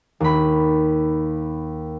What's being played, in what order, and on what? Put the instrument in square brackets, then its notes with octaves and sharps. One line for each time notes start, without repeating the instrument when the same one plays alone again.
[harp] D#2 B5